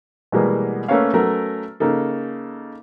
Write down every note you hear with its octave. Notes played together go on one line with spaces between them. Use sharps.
B2 E3 G3 G#3 A#3 B3
A3 A#3 C#4 B4 C#5 F5
F#3 A3 B3 C#4 A#4
C#3 A#3 D#4 A4